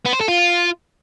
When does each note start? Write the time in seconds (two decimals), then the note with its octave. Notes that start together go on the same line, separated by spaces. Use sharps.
0.06 B3
0.13 C5
0.21 A4
0.28 F4